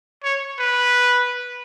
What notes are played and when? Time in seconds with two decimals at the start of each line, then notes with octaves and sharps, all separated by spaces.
0.24 C#5
0.59 B4